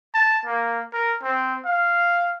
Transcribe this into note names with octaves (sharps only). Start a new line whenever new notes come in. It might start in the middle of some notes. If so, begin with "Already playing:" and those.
A5
A#3
A#4
C4
F5